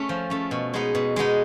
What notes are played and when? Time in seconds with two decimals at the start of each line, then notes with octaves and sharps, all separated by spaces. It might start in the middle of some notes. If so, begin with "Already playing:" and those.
Already playing: A3 C#4
0.09 F3
0.30 A3 C#4
0.51 B2
0.74 G#3 B3 D#4
0.95 B2
1.16 G#3 B3 D#4